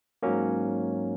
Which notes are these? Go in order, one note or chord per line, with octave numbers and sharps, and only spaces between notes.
G#2 F#3 A#3 C#4